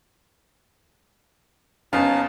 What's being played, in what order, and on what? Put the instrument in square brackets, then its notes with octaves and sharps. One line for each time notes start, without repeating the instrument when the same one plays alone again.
[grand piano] F#1 B3 F5 [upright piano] C#4 [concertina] D#4 A5